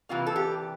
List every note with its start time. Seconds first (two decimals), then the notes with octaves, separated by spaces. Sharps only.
0.09 C3 E3 G3 A#3 F4
0.26 A4
0.36 G4